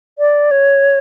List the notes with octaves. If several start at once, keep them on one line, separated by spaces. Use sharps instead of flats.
D5
C#5